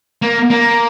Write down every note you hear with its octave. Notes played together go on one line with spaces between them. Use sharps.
A#3
A#3